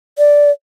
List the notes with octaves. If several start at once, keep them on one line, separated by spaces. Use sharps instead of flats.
D5